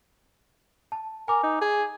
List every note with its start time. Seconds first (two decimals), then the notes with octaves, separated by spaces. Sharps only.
0.92 A5
1.28 A#4 G#5 D6
1.43 D#4
1.61 G#4